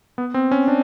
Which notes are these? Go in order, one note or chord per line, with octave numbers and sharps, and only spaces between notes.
B3
C4
C#4
D4